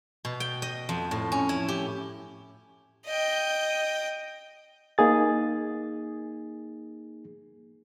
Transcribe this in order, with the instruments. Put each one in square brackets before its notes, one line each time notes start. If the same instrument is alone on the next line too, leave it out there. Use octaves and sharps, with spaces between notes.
[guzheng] B2
G5
D#5
F2
A2
C#4
E4
G4
[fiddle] D#5 G5
[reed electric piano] A#3 D#4 G#4 A6